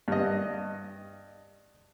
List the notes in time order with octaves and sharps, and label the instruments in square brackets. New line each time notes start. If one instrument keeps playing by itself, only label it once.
[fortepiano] G2 D#5